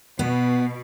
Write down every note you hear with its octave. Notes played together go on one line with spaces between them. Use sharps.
B2 B3